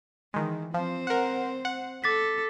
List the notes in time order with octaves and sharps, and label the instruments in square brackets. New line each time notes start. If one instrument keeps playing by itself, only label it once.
[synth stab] D#3 G#3 [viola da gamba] E3
[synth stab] F3 [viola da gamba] C4 C5
[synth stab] A#4 F#5
F#5
[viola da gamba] A4 [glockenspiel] D6 A6 B6